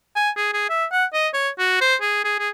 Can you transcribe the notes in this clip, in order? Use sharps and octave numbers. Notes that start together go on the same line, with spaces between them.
G#5
G#4
G#4
E5
F#5
D#5
C#5
F#4
C5
G#4
G#4
G#4